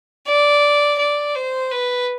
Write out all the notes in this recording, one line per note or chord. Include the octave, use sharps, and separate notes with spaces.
D5
D5
C5
B4